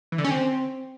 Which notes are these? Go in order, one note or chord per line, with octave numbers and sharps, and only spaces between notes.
E3
D3
C#4
C4